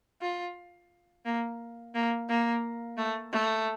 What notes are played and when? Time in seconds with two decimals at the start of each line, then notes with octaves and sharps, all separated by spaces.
0.21 F4
1.25 A#3
1.95 A#3
2.29 A#3
2.97 A3
3.32 A3